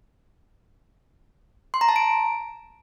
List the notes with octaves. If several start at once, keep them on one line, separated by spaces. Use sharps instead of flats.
C6
A#5
A5
D7